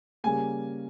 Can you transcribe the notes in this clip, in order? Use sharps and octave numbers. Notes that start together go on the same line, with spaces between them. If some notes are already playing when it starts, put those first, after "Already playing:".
C#3 G3 A#3 G#5